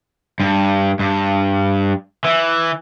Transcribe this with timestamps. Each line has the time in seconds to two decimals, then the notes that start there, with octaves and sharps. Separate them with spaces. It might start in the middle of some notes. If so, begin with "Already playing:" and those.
0.40 G2
0.99 G2
2.25 E3